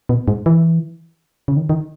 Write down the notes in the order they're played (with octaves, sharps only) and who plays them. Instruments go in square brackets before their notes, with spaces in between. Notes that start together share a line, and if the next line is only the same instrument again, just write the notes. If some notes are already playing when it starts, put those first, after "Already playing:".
[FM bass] B2
G#2
E3
C#3
D#3
D#3